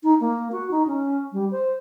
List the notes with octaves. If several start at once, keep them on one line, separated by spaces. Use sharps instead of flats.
D#4
A#3
F#4
D#4
C#4
G3
C5